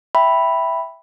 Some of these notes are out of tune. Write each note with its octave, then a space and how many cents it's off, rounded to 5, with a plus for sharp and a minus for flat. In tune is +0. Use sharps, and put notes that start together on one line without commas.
E5 +0 G5 +0 B5 +0